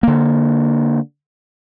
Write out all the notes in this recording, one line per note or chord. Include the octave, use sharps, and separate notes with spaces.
D3 A#3